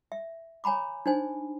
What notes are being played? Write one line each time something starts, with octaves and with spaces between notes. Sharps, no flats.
E5
C#5 G#5 A#5 B5 D6
D4 D#4 C5 G#5